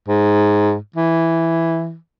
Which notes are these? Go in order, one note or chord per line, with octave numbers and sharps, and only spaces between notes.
G#2
E3